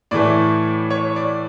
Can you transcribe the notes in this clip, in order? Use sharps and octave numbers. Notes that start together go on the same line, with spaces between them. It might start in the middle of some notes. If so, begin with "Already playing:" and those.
A2 E3 A3 D5
C#5
D5